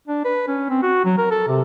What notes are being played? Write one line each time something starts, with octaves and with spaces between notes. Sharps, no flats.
D4
B4
C#4
C4
F#4
F#3
A#4
A4
C3